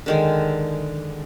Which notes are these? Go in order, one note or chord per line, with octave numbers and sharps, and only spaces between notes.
D3 D#3 G#3